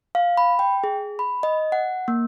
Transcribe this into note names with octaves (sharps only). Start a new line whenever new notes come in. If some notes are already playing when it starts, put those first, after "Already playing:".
F5
B5
G5
G#4
B5
D#5
F#5
A#3